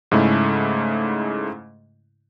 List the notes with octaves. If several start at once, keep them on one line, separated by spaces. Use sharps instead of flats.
G#2 C#3 G#3 A3 E4